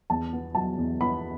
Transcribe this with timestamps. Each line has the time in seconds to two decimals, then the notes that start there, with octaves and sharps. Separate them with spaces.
0.10 E2 A5
0.33 B3
0.55 F#3 A5
0.78 E2
1.01 B3 B5